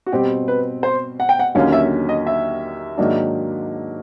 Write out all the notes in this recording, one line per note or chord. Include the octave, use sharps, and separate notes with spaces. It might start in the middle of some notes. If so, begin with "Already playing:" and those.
F#4
B2 G3 C4 G4
B4
C5
F#5
G5
F#5
D#2 D3 F#3 A#3 C#4 F5
E5
D#5
E5
G#2 D#3 F#3 A#3 D4